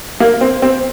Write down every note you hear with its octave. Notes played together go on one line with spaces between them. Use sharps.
A#3
C4
C4